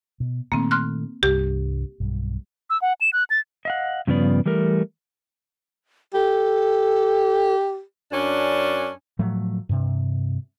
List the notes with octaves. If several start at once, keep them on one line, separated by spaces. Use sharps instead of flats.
B2
A#2 D#3 A3 A#3 C4
C6 F6 F#6
C2 G2 G4
B1 G2
E6
F#5
E7
F#6
A6
D#5 F5 F#5
G2 C#3 F3 B3 D5
E3 G3 A3 A#4
G4 A4
F#2 C#4 D4
A2 F3 F#3 A3
G2 C3